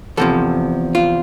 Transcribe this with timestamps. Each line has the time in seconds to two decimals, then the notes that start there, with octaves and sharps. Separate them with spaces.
0.17 E2 C3 F3 A4
0.95 F4